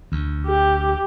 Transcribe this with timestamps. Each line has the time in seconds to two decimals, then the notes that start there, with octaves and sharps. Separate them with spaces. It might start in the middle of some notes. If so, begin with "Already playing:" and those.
0.12 D2
0.47 G4